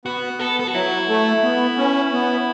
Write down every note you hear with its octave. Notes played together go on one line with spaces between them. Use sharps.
B3 F#4
B3 A4
A4
F#4
F#3 E4
A3
B3
C#4
B3